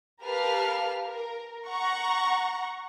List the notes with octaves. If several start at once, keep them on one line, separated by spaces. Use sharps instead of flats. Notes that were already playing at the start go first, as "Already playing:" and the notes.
G4 A#4 B4 F5 A5 F6
A#4
F#5 A#5 C#6